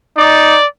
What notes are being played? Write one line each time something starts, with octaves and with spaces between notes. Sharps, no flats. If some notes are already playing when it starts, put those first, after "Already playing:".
D#4 D5